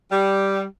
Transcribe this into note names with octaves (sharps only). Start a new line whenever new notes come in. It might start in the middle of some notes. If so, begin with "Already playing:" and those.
G3